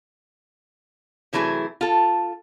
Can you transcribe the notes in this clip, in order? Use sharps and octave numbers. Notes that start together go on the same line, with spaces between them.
C3 E3 F#3 A3 E4 G#4
F4 A4